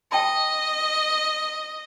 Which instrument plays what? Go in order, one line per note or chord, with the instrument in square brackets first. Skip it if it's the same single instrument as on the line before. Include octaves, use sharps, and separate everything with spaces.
[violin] D#5 [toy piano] G5 A5 B5